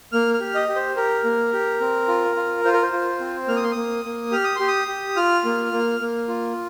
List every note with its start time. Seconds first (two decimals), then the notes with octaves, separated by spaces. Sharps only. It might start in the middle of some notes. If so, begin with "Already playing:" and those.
0.12 A#3 F6
0.34 F6
0.40 G4
0.55 D#5
0.69 G4
0.76 C5
0.96 G4 A#4
1.24 A#3
1.53 G4
1.81 C4
2.08 F4
2.36 F4
2.65 F4 C5
2.73 A#4
2.82 C5
2.92 F4
3.20 C4
3.48 A#3 F6
3.56 D#6
3.63 C6
3.72 A#3 D#6
4.05 A#3
4.32 G4 F6
4.44 D#6
4.56 G4 C6
4.68 D#6
4.88 G4
5.16 F4 F6
5.45 A#3
5.72 A#3
6.00 A#3
6.28 F4